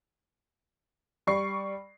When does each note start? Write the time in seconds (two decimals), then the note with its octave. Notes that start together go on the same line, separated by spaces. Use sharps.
1.27 G3 D5 C#6 C7